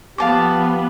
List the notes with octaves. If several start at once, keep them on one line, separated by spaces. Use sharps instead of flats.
F3 B3 G4 F5 A5 D6